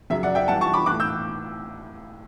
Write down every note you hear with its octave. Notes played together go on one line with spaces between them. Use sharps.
F#2 C#3 F#3 E5
D5 F#5
E5 G5
G2 E3 F#5 A5
A5 C#6
B5 D6
E3 D6 F#6
A2
E6 G6